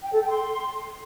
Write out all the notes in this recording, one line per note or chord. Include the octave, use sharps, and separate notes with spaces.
G5
A4
G5
C6